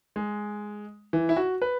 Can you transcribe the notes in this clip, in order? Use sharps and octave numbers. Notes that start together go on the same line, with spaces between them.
G#3
E3
E4
F#4
B4